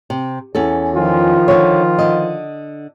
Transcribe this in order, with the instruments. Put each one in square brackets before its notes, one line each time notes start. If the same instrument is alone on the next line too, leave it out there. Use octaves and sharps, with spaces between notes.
[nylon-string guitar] C3
E2 C#4 A4
[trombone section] D#3 F3 F4
[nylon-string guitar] D3 C#5
D3 D#5